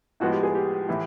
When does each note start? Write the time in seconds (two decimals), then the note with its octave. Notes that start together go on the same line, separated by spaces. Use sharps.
0.20 A2 F3 G#3 B3 F#4
0.32 G4
0.43 G#4
0.55 G4
0.89 A2 E3